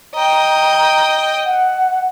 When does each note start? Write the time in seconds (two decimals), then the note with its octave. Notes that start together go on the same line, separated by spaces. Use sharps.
0.15 D#5 G5 A#5
1.45 F#5